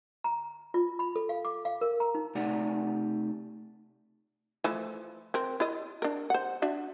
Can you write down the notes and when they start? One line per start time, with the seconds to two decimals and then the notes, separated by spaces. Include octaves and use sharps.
0.24 A#5
0.74 F4
0.99 B5
1.16 A4
1.29 F5
1.45 D6
1.65 F5
1.81 A#4
2.00 A#5
2.15 D#4
2.35 C3 A3 D#4 G4 D5 F#5
4.64 E3 F3 A3
5.34 C4 A#4
5.60 E4 D5 D#5
6.02 D4 A#4
6.30 C5 F#5
6.62 D4 F#4 E5